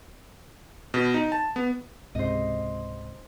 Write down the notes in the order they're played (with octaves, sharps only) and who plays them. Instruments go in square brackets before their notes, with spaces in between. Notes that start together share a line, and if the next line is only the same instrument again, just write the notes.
[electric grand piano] B2
D#4
A5
B3
[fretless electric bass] C#2 G#2 C3 [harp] C5 D#5